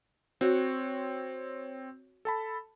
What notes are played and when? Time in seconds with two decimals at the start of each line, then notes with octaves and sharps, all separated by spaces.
0.41 C4 F#4 C#5
2.25 A4 A5 B5